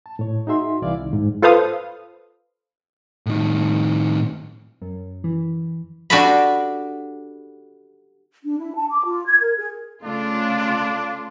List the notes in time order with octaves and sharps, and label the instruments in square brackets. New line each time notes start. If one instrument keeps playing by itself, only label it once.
[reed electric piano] A5
A2 C#5
D#4 F#4 G#4 E5 C6
C2 E3 E4 D5 F5
C2 D#3
G#2
[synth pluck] F4 A4 B4 C5 F5 D#6
[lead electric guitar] A2 D#3
[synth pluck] F#2
E3
[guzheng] D4 F#4 G4 A4 D#5 B5
[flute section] D4
E4
A5
D6
F4
G#6
A#4
G#4
[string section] C#3 A3 F4 [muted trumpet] D4